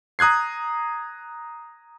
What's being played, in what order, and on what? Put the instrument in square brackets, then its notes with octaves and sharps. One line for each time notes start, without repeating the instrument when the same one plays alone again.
[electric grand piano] A#5 D#6 F#6 G#6 C7